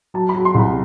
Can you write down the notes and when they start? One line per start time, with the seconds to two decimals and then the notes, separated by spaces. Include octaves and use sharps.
0.14 F#3 A5
0.29 B5
0.34 F#3
0.45 C6
0.55 C2 B5